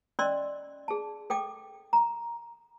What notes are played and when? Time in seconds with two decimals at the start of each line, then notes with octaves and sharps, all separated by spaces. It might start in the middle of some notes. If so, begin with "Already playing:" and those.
0.19 C#4 D5 D#5 C6 E6
0.88 G#4 A5
1.30 A4 G5 D6
1.93 A#5